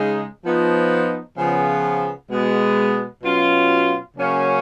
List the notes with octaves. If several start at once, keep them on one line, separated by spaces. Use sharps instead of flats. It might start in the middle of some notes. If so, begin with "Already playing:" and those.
Already playing: C#3 G#3 D#4
F3 B3 D#4
C#3 F3 B3
B2 G#3 B3
B2 F#3 C#4 F4
C#3 F#3 A#3 C#4